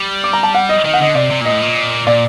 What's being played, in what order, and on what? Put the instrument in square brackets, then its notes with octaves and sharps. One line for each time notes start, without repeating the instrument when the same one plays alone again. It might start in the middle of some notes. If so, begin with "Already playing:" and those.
Already playing: [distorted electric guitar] G3
[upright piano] D6
A#5
A5
F#5
D#5
[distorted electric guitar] D#3 [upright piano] D#5
[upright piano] F#5
[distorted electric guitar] D3 [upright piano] D#5
[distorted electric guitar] C3 [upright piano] D5
[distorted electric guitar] C3
[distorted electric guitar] A#2 [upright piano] D#5
[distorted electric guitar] A2
A#2
[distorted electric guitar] A#2 [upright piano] D5